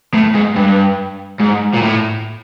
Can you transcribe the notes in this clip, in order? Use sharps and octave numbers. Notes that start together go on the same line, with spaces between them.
A2
G#2
G2
G#2
A#2
A2